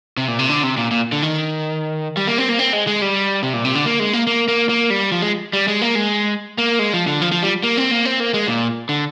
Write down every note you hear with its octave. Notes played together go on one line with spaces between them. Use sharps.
C3
A#2
C3
D3
C3
A#2
A#2
D3
D#3
G3
A#3
C4
A#3
C4
G#3
G#3
G3
C3
A#2
C3
D3
A#3
G#3
A#3
A#3
A#3
A#3
G3
F3
G#3
G3
G#3
A#3
G#3
A#3
G#3
F3
D3
F3
F3
G3
A#3
C4
A#3
C4
A#3
G#3
A#2
D3